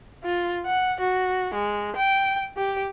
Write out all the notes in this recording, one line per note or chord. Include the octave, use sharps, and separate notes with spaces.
F4
F#5
F#4
G#3
G5
G4